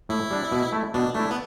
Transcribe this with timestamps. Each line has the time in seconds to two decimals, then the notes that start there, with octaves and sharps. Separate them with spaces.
0.09 A2 E4
0.31 G3 D4
0.52 B2
0.72 A3 E4
0.94 B2 D4
1.15 A3 D4 E4
1.31 B3